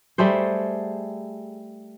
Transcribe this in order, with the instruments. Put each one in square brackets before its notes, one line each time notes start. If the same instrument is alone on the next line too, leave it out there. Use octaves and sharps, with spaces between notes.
[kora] G3 A3 G#4 C5